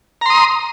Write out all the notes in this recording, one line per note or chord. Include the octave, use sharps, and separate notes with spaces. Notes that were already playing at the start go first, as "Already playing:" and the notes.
A#5 C6 D#6